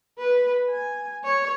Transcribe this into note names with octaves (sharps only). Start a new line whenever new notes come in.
B4
G#5
C#5